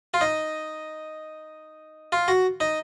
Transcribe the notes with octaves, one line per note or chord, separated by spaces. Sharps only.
F4
D#4
F4
F#4
D#4